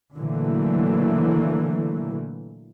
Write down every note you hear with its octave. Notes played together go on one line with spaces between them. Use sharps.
A#2 D3 E3 F#3 A3 A#3